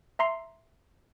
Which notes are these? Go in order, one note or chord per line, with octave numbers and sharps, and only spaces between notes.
E5 A#5 C6 C7